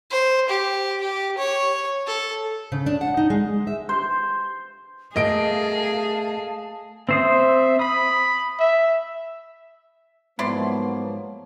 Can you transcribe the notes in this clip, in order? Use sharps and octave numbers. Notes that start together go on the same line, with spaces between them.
C5
G4
G4
C#5
A4
C#3
D4
F#5
D#4
G#3
E5
C5
A3 G#4 A#4 D#5 F5 A5 D7
C4 C5 E5 D#6
B5 D#6
E5
G#2 F3 F#3 A#3 B3 E4 D5 C6